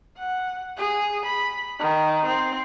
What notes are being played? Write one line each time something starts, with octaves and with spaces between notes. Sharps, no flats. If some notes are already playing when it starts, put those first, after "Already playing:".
F#5
G#4
B5
D#3
C4